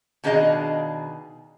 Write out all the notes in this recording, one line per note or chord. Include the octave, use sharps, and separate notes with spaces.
B2 D#3 D4 G#4 D#5 F5